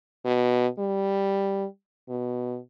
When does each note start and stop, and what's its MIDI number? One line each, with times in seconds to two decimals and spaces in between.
0.25 0.67 47
0.79 1.65 55
2.09 2.58 47